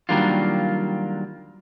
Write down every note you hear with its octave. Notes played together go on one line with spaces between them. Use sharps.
D#3 F#3 G3 A#3 D4 F4